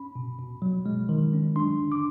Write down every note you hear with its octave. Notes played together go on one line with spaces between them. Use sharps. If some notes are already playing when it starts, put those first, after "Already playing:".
Already playing: C#4 B5
B2
B2
F#3
G#3
D#3
C#4
D4 C6
D3
D6